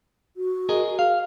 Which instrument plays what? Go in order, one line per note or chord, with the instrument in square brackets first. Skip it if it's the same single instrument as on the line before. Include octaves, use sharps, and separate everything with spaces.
[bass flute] F#4
[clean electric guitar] G#4 A#4 D#5
F5